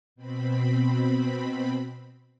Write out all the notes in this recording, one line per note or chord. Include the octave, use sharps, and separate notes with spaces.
B2 C4 B5